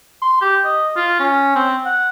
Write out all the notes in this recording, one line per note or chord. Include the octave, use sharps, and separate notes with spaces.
C6
G4
D#5
F4
C#4
C4
F#5